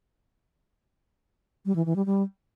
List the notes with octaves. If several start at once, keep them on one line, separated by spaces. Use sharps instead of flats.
G3
E3
E3
G3
G3